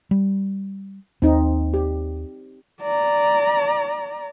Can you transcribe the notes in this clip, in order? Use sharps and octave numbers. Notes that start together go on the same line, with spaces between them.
G3
D#2 C4 D#4
G4
D5 A#5